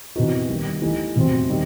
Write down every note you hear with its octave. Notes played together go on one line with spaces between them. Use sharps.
C3 E3 B3 D#4 F#4
D#2 D#3 G3
E3 A3 D#4 G4
E2 C3 F#3 C4
D#3 G3